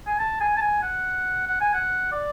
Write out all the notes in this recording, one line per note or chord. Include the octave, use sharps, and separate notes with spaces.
G#5
A5
G#5
A5
G#5
F#5
F#5
G#5
F#5
D5